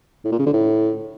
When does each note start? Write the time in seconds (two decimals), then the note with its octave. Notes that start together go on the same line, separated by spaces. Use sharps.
0.25 A2
0.32 A#2
0.39 C#3
0.46 D3
0.53 A2